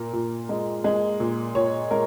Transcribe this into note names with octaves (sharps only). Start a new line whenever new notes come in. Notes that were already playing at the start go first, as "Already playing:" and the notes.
Already playing: A#2 A#4
A#2
G#3
G#3
A#2
A#2 C#5
G#3 A#4